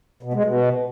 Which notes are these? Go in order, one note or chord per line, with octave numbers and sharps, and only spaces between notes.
B2
G#3
B2